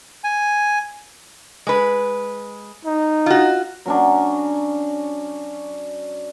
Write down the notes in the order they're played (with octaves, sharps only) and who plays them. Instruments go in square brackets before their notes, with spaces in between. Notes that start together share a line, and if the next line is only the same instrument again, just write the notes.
[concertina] G#5
[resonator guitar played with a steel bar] G#3 B4
[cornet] D#4
[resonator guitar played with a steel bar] F4 F#4
[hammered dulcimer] F#3 C#4 D4